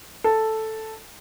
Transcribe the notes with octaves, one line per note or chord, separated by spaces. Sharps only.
A4